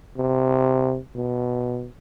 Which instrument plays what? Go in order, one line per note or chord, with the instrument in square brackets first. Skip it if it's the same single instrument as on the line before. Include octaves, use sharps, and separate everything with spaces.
[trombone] C3
B2